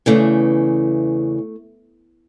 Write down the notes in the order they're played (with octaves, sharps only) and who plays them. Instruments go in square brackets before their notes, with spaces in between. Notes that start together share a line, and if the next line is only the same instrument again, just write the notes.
[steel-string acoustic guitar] E2 C#3 E3 A3